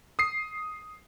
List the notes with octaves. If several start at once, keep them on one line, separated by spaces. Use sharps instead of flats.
D#6 C7